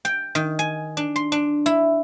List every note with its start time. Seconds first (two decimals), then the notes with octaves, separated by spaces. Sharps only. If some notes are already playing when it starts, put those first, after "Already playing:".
0.05 G5
0.35 D#3
0.59 G#5
0.97 D4
1.16 C6
1.32 D4
1.66 E4